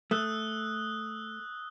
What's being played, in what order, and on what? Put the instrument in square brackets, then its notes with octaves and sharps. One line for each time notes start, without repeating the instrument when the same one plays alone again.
[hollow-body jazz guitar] A3 [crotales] D#6 E6 F#6